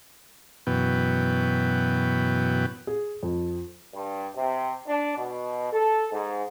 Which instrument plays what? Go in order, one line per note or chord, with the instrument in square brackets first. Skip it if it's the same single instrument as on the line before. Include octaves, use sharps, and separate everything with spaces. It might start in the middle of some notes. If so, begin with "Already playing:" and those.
[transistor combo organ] F#2 B2 E3 B3 G5
[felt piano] G#4
F2
[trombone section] G2
C3
D4
B2
A4
G#2